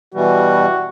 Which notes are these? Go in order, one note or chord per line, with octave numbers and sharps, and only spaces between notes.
B2 E3 G3 F#4